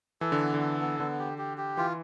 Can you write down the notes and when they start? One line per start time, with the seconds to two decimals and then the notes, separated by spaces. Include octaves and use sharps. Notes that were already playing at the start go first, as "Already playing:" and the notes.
0.21 E3 A4
0.32 D3
0.41 B3
0.54 D3
0.61 A4
0.80 B3
1.00 D3 B3
1.19 G4
1.38 G4
1.58 G4
1.77 E3 F4